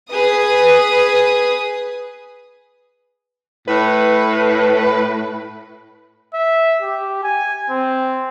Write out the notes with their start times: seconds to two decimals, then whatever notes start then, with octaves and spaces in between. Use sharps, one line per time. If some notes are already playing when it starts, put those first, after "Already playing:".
0.12 G#4 B4 D#6
3.68 A2 B4
6.34 E5
6.82 G4
7.23 G#5
7.70 C4